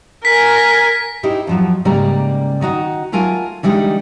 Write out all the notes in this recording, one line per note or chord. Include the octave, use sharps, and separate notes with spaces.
A#4 G#5 B6
D#4 E4 G4 C5
F2 F3 F#3
G#2 C#3 G3 A#3 D5 A#5
D#3 D#4 F#4
F#3 A3 F4 A#4 G#5
D3 E3 G3 G#3 D#4